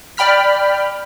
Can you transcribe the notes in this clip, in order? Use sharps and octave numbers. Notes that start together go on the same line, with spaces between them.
D5 G5 B5 F6 B6